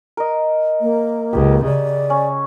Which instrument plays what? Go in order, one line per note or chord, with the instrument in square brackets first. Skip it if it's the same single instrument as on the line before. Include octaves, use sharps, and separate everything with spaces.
[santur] A#4 D#5
[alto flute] A#3
[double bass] C#2 [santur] G4
[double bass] C#3 [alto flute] D5
[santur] C#4